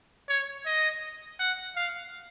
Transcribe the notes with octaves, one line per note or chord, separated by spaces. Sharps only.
C#5
D#5
F#5
F5